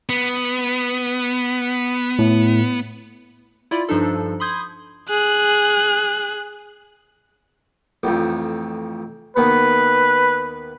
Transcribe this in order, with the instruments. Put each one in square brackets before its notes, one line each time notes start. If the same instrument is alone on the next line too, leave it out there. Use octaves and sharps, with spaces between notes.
[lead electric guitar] B3
[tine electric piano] A2
[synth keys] E4 F4 D5 B5
G2 F3 D4 D#4 A4
B5 C6 D#6 G6 G#6
[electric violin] G#4 F#6
[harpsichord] A1 F2
[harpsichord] D#2 B3 [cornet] B4